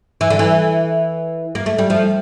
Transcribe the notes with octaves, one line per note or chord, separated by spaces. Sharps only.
E3
D3
E3
A#3
A3
G3
F3